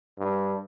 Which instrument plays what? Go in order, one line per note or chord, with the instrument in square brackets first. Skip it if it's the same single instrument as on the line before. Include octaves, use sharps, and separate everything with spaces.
[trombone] G2